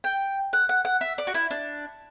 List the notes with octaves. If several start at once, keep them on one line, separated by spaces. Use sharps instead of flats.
G5
F#5
F#5
F#5
E5
D5
F#4
E4
D4